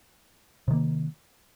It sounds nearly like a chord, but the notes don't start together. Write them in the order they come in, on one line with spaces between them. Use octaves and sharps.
C3 D#3 A#3